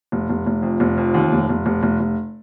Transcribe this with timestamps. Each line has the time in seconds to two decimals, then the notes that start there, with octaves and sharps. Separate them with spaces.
0.12 F1
0.29 F1
0.46 F1
0.63 F2
0.80 F1
0.97 F2
1.14 D#2
1.32 F1
1.49 F1
1.66 F1
1.83 F1
2.00 F1